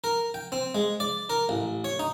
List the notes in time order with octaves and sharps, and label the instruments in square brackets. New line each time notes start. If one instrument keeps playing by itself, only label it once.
[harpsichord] A#4
G5
C4
G#3
D5
A#4
A1
C#5
D#4